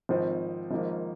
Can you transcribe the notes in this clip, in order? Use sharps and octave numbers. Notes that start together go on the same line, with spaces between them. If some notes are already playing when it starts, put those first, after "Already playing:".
G#1 G#2 F3 C4
G#1 G#2 F3 A#3